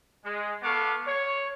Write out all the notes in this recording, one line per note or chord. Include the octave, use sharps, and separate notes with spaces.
G#3
B3 A4 F5 C#6 D6
C#5